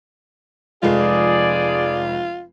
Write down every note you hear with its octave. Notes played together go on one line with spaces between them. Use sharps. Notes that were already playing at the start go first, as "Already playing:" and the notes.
F1 F2 G#3 F4 G#4 D5